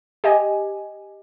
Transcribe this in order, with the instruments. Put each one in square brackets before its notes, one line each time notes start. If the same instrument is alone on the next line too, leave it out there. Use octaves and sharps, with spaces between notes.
[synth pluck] G4 D#5 G#5